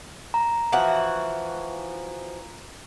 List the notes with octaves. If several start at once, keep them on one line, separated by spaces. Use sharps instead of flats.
A#5
E3 F3 F#4